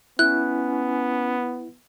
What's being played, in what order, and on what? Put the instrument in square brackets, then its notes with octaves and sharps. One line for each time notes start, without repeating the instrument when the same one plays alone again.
[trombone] B3 [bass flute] C#4 [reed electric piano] E4 [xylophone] F#6